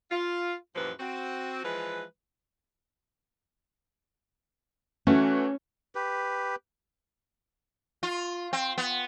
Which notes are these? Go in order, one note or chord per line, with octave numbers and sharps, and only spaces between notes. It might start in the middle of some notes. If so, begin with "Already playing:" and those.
F4
F#2 A#2 E3 F3 G4 B4
C4 F#4
E3 F3 G#3 B4
E3 A3 C#4 F#4
G4 B4
F4
C4
B3